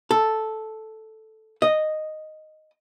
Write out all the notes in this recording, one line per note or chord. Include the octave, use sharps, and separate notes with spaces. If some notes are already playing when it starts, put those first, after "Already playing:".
A4
D#5